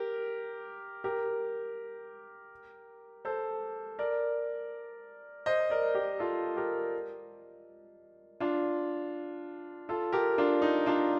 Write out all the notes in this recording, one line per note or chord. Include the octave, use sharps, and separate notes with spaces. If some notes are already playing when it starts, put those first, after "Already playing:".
Already playing: G4 A#4
G4 A#4
A4 C5
A#4 D5
C5 D#5
A#4 D5
G4 A#4
F4 A4
G4 A#4
D4 F4
F4 A4
G4 A#4
D4 F4
D#4
D4 F4